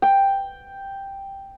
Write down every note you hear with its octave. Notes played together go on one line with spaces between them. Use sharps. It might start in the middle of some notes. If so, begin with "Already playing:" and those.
G5